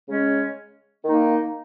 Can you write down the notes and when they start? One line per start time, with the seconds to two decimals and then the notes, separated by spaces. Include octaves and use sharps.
0.08 C#3 G#3 C#4
1.03 D#3 A#3 D#4